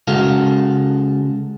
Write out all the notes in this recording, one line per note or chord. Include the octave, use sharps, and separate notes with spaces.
C#3 G#3 F#4 A4 F5